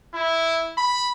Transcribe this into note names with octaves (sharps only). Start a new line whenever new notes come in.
E4
B5